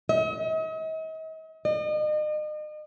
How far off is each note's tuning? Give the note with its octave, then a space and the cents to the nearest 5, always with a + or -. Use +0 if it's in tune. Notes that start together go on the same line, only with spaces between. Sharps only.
D#5 +45
D#5 -40